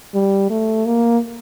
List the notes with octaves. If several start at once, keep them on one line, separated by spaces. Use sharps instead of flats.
G3
A3
A#3